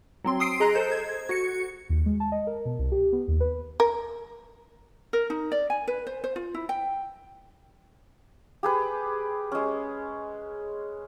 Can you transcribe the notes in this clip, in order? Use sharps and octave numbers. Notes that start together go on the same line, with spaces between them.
F#3 C4 C6
C6 D#6 E6 C7 D7
G#4 D#5 A#5 F#6
A4 C5 G6
G#6
F#4 C#7
D#2
G#3
A5
D#5
A#4
B2
C2
G4
B3
D#2
B4
A#4
A#4
D#4
D5
G#5
B4
C5
C5
F4
E4
G5
G4 G#4 B4
G#3 C#4